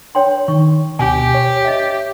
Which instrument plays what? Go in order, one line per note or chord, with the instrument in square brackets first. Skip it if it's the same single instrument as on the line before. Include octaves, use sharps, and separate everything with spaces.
[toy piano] C#5 G5 C6
[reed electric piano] D#3 [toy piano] C#6
[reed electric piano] D2 B2 [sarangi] G4 [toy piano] G#5
[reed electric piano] C#5
[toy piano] D#5 E5